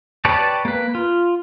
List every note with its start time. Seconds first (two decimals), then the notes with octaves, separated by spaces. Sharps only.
0.25 G4 B4 C#5 D5 A5
0.65 A#3 B4
0.95 F4